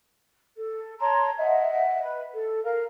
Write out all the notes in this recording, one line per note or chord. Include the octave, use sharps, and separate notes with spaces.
A4
C#5 A5 A#5 C6
D#5 E5 F#5
B4
A4
A#4 F5